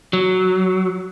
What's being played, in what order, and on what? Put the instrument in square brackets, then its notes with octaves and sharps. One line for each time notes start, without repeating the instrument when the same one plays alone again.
[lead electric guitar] F#3